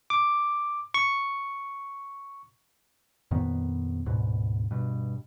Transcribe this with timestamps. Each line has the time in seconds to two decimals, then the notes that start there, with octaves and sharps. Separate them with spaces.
0.10 D6
0.94 C#6
3.31 F2 A#2 D#3 B3
4.06 D2 G#2 B2
4.71 G2 B2